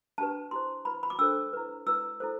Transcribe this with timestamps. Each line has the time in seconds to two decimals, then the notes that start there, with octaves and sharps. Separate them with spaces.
0.18 D4 G4 B4 A5
0.51 E4 G4 C5 C6
0.85 E4 B4 B5
1.03 B5
1.10 D6
1.19 D4 A4 C5 E6
1.53 E4 B4
1.87 E4 B4 E6
2.20 E4 A4 C5